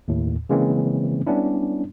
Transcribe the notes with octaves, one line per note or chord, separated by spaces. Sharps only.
D#2 A2
C#3 E3 G#3 A#3 C4 C#4
G3 B3 C#4 D4 E4